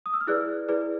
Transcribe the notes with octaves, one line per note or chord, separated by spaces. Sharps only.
D#6
E6
F6
E4 G#4 B4 D5 F#6
E4 G#4 B4 D5